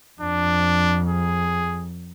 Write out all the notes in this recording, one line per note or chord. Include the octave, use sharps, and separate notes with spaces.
F2 D4
G#4